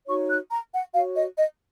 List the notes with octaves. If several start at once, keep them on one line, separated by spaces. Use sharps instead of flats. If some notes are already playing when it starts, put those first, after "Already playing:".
D#4 F#4 C#5 C#6
F#6
A#5
F#5
F#4 C#5 F5
D#5
D#5